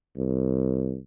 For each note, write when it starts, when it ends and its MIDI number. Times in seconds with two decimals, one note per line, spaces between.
0.17 0.97 36